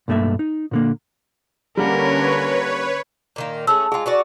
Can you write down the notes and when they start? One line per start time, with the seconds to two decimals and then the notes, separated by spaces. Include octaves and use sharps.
0.08 B1 G2 A3 A#3 E5
0.39 D#4
0.71 A#2 D3 A#3
1.77 D3 G3 A#3 C#4 A#4 B4 C#5 F#5
3.36 A#2 D#3 A#3
3.67 A3 C#4 G#4 E6
3.92 G#3 F4 G#4 G#5
4.06 B3 F#4 D5